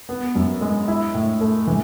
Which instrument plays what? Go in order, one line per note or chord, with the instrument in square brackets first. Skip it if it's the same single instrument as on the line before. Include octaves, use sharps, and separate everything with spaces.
[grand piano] B3
F#2
G#3
E4
A2
A3
E3